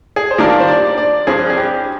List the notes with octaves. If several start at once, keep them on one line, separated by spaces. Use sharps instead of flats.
G#4
C5
D#3 G3 A#3 D4 F4 A#4
C5
D5
D5
G2 F3 C4 G#4
G#4
G4